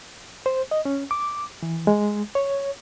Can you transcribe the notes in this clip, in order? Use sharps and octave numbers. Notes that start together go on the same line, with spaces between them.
C5
D#5
C#4
D6
E3
G#3
C#5